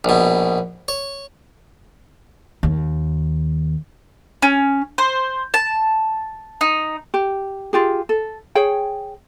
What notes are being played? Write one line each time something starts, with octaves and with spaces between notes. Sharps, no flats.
A#1 B2
C#5
D#2
C#4
C5
A5
D#4
G4
F4 G4 G#4
A4
G#4 C#5 G5